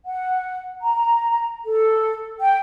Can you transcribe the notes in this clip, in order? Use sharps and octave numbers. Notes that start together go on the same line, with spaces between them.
F#5
A#5
A4
G5